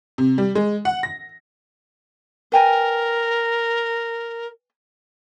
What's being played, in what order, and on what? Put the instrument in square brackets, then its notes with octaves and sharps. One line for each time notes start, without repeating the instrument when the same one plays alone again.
[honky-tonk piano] C3
G3
G#3
F#5
A#6
[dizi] A#4 [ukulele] B4 G5 G#5